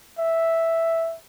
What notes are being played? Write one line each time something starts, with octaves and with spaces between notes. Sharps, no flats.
E5